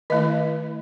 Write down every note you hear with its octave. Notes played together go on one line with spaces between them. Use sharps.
D#3 A3 E4 D#5